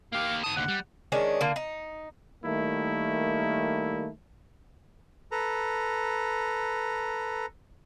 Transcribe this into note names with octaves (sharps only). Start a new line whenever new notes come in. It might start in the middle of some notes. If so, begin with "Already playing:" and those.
A#3 G4 F5
G#2 A5 D#6
D#2 D3 F#5
G3
D#3 G#3 C#4 D4
D3 A#3
D#4
D#3 G3 A3 A#3 E4
A4 B4 A#5